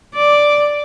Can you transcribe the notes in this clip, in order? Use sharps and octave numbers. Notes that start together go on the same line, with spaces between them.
D5